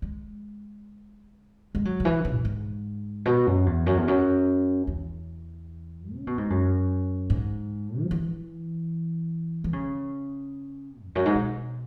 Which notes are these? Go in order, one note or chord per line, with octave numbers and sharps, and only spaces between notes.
G#3
G#3
F#3
C#3
E3
C#3
F#2
G#2
B2
F#2
E2
F#2
E2
F#2
E2
C#3
B2
G#2
F#2
G#2
F#3
E3
E3
C#3
E2
F#2
G#2
B2